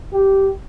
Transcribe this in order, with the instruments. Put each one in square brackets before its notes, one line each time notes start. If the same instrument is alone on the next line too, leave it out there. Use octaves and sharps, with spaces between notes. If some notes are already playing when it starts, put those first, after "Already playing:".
[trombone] G4